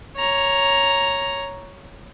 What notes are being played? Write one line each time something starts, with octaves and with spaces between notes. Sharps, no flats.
C#5 A#5